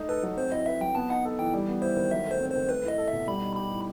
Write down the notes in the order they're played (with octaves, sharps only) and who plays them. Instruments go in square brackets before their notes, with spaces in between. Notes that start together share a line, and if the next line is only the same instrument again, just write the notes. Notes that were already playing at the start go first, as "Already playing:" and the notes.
Already playing: [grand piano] A3 D#4
[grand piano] A4 [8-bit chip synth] B4
[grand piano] F#3
[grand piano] C4 [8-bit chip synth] C5
[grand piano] E4 [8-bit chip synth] D#5
[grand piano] B4 [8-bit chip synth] E5
[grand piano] F#3 [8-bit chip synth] G5
[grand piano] B3 [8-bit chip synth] A5
[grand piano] D#4 [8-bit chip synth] F#5
[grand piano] A4
[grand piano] E3 [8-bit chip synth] G5
[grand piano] G3
B3
[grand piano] E4 [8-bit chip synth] C5
[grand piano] D#3
[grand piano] F#3 [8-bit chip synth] E5
[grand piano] A3
[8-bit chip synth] C5
[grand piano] C4
[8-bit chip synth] C5
[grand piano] D#3
[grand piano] A3 [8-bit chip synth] B4
[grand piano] E4 [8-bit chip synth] D#5
[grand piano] A4
[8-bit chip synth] E5
[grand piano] B2
[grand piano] G3 [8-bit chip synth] B5
[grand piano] D#4
[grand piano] G4 [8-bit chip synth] B5
[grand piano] A2